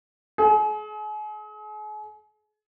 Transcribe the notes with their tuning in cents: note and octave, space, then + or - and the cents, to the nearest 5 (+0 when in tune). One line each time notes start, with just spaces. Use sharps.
G#4 +40